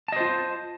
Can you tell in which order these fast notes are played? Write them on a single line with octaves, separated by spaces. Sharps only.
A5 D#5 C5 F4